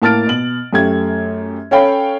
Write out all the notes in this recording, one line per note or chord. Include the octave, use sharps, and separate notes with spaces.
A2 A#3 A5 F6 A6 D7
B2 F#7
F#2 A3 G4 G#6
C#4 A4 C#5 F5 G5 B5